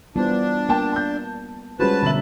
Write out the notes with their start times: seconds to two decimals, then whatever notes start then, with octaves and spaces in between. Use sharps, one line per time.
0.16 E3 G3 B3 D4 F4 C5
0.69 A#3 G5 A5
0.92 A5 G6
1.80 G3 G#3 C#4 F4 F#4 B4 C5 A5
2.03 E1 D3 C#4 E5 F#7